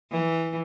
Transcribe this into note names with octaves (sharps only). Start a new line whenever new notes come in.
E3